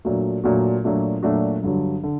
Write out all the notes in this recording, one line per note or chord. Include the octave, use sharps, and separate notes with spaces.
A#2 F#3 A3 D4 F#4
A#2 F#3 A3 D4 F#4
A#2 F#3 A3 D4 F#4
A#2 F#3 A3 D4 F#4
G2 D3 F#3
D3